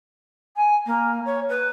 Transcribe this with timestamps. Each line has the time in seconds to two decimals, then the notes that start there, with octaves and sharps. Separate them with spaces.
0.56 G#5
0.86 A#3
1.25 C#5
1.49 B4